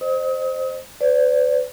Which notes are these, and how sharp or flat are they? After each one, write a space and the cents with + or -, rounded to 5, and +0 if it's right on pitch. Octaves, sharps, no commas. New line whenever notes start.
C5 +0 D#5 -30 D#6 +35
B4 +40 D5 -25